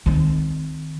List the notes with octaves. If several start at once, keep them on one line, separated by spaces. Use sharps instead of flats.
D#3 C4